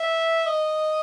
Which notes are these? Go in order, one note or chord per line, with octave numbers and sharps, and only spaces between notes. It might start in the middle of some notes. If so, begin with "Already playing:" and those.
Already playing: E5
D#5